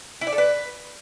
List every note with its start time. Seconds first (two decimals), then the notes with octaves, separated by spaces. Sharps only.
0.21 E4
0.27 D5
0.32 A4
0.38 B4